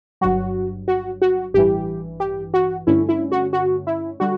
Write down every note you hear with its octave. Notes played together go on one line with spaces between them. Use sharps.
G1 G2 F#3 F#4
F#4
F#4
A1 G2 E3 G4
G4
F#4
G2 D3 A3 C#4 E4
E4
F#4
F#4
E4
D3 G3 F#4